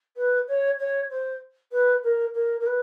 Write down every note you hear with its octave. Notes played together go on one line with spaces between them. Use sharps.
B4
C#5
C#5
C5
B4
A#4
A#4
A#4
B4